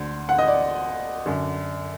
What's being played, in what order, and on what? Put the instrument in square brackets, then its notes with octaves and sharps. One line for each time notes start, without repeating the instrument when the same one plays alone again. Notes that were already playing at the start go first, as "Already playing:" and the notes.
Already playing: [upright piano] D2 D3
F#5
D#5
D5
F#2 D3